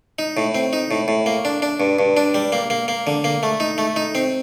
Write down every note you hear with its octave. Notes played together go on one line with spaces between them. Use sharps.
D#4
A2
C4
D#4
A2
A2
A#3
D4
D4
G2
G2
D4
G3
A#3
A#3
A#3
D3
A#3
A3
D#4
A3
D#4
C4